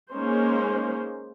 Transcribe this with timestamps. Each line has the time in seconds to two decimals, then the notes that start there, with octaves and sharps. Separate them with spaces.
0.11 G#3 A#3 C#4 D#4 C5